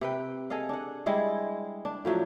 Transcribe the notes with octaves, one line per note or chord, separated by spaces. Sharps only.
C3 B4 G5
G#4 A4 D#5 F5
D4 F#5
G3 G#3 E4 G#4
D4
A2 F3 F#3 E5